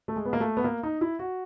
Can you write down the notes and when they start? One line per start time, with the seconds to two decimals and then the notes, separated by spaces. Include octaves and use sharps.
0.08 A3
0.16 G#3
0.25 B3
0.33 A#3
0.40 A3
0.57 B3
0.64 A#3
0.83 D#4
1.01 E4
1.19 F#4